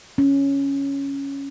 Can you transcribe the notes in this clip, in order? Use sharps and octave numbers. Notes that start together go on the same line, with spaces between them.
C#4